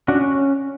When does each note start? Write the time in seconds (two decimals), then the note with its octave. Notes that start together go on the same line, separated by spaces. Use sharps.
0.08 C#4 D4 F#4